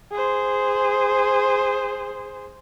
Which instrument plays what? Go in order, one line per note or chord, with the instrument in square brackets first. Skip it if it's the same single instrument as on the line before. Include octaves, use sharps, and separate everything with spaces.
[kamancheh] G#4 C5